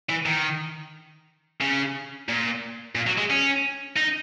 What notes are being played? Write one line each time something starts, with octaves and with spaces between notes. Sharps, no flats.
E3
D#3
C#3
A#2
A#2
F#3
G#3
C#4
D#4